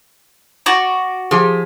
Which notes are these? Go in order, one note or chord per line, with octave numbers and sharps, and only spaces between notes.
F#4 D5 C#6
F3 G4 G#4